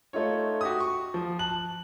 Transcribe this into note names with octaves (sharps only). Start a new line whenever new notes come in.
A3 D#4 F4 C#5
F#4 G4 D#6
C#6
F3
A5 F#6 F#7